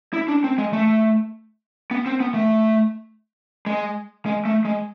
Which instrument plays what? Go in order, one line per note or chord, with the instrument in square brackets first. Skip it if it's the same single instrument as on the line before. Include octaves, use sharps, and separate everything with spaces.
[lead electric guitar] E4
D4
C4
G#3
A3
B3
C4
B3
A3
G#3
G#3
A3
G#3